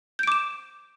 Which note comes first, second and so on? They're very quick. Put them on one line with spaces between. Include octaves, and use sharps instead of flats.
G6 D7 D6 E7